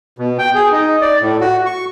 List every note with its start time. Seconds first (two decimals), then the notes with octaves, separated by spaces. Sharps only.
0.18 B2
0.39 G5
0.55 G#4
0.72 D#4
1.01 D5
1.22 A2
1.40 F#4
1.66 C#6